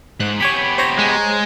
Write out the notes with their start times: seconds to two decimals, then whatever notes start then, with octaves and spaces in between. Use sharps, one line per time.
0.20 G#2 F#6
0.40 B3 G4 C#5 G#5 B5
0.78 C5 C#5 A#5
0.99 G#3